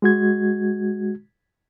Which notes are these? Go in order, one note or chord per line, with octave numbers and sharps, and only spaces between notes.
G#3 F#4 G#6